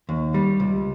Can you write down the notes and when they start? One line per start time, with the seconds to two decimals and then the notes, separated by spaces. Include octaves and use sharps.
0.09 D#2
0.34 G3
0.60 C#2